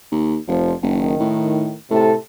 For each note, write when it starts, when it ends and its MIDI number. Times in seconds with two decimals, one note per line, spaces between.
0.12 0.37 39
0.48 0.73 29
0.48 0.73 41
0.48 0.73 53
0.82 1.14 30
0.82 1.73 51
1.20 1.75 45
1.91 2.15 45
1.91 2.14 48
1.91 2.14 69